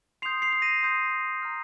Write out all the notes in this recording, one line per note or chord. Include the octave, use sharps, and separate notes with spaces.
C6 D#6 G6 C7 F7
C7 F7
C7
A#6 D#7
C6 D#6 G6
A#5 F6